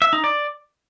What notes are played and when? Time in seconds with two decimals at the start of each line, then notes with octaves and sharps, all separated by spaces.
0.02 E5
0.13 D#4
0.24 D5